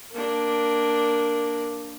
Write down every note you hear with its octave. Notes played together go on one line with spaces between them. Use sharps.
A#3 D4